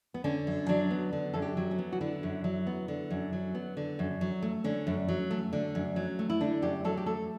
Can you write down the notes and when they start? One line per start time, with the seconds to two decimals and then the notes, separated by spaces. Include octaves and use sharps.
0.14 B3
0.24 D3 C#4
0.47 F#2
0.69 F#3 D4
0.91 B3
1.13 D3
1.33 F#2 A4
1.42 G4
1.57 F#3
1.71 C#4
1.79 B3
1.92 F#4
2.01 D3 E4
2.23 F#2
2.44 F#3
2.67 B3
2.88 D3
3.10 F#2
3.33 F#3
3.55 B3
3.77 D3
3.99 F#2
4.21 F#3
4.42 A3
4.64 D3 C#4
4.87 F#2
5.08 F#3
5.31 A3
5.53 D3
5.75 F#2
5.96 F#3
6.19 A3
6.30 E4
6.41 D3 D4
6.62 F#2 G4
6.84 F#3 A4
6.97 G4
7.06 A3 A4